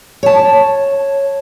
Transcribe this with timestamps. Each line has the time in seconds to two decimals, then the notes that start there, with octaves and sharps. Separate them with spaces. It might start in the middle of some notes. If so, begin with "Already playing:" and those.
0.23 C#5 A5